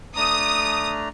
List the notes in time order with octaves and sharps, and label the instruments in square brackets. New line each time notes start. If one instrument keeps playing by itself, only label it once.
[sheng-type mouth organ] A3 D4 A#5 [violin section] D#6